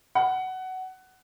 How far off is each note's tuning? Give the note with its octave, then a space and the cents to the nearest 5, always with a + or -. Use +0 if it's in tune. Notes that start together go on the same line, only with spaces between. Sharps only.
F#5 +15